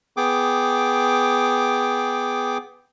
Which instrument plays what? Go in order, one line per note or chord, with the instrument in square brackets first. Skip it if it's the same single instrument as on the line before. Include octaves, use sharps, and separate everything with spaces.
[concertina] B3 G#4 G5 D6